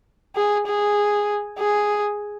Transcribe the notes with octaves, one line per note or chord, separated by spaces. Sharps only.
G#4
G#4
G#4